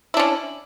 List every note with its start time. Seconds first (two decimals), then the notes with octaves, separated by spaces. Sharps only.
0.14 E4
0.17 D4
0.20 C#4